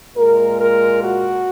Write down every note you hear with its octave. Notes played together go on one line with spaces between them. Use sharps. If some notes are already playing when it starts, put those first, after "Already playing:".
A#2 G#3 A#4
A#4
F#4